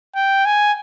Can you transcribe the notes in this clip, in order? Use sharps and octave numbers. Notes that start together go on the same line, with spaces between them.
G5
G#5